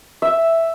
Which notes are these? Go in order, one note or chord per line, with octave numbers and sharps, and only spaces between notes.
E5